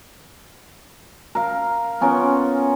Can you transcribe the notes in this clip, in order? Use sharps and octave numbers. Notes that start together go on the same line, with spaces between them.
A#4 F5
B3 C#4 F4 A#4